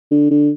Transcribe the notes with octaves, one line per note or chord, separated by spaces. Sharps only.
D3
D3